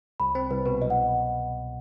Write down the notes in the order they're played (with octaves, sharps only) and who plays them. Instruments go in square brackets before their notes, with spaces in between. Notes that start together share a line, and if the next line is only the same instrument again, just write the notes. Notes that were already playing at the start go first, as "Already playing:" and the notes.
[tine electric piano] C2 [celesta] B5
[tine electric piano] C4 [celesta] C5
[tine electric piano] C2 [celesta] B4
[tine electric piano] B2 [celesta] B4
[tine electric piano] F#3 [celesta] D#5
[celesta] F#5